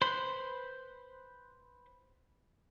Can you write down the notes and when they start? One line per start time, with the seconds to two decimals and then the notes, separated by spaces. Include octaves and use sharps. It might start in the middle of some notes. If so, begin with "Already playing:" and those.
0.02 B4 C5 B5 C6